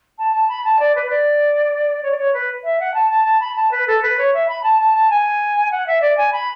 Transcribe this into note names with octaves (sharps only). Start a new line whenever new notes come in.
A5
A5
B5
A5
D5
B4
D5
C#5
D5
C#5
B4
E5
F#5
A5
A5
A5
B5
A5
B4
A4
B4
C#5
E5
B5
A5
A5
A5
G#5
F#5
E5
D5
G#5
B5